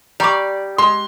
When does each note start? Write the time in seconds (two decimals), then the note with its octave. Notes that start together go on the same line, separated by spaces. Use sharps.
0.20 G3 D5 A#5 C#6 D6
0.78 G#3 C6